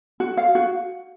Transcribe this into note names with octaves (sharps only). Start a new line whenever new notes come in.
F#4
F5
F#4